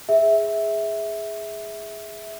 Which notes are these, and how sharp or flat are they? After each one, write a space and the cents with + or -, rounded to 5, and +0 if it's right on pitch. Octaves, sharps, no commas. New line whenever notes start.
G#4 +0 E5 -10